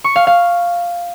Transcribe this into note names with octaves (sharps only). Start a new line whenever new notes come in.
C#6
F5
F5